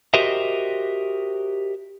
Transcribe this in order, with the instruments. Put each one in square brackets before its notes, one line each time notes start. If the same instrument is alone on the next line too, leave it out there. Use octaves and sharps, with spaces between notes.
[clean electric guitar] F#4 G4 A#4 C5 D#5 E5